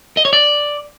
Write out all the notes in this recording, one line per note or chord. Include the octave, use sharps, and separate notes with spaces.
D#5
C#5
D5